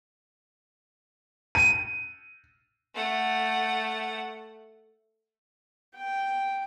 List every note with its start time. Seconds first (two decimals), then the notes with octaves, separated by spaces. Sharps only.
1.55 D#7
2.95 A3 F#5
5.96 G5